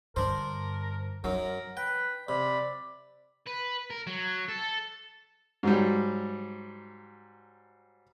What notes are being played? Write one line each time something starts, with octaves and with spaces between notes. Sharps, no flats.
G2 D3 D4 A#4 C5
F#2 F#3 D#4 A#4
B4 G5
C3 D5 B5
B4
A#4
F#3
A4
G#2 F#3 G3